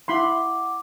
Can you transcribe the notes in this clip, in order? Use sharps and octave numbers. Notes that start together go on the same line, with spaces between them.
E4 F#5 B5 C6 D6